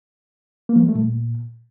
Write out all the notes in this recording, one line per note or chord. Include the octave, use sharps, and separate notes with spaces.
A#3
F3
G3
A3
A#2